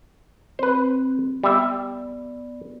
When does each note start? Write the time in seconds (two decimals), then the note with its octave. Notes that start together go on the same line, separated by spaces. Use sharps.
0.59 C4 B4 C5
1.44 G3 B3 D5 E5